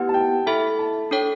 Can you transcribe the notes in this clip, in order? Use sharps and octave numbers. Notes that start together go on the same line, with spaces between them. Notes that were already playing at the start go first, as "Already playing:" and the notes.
Already playing: B3 E4 G4 B4 F#5
A5
G5
E4 A4 E5 B5
A5
D4 A4 C#5 G5